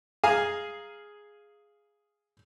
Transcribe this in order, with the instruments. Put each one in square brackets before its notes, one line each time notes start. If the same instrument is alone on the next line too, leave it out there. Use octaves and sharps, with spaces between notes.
[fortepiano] G#4 F5 G#5 A#5 D#6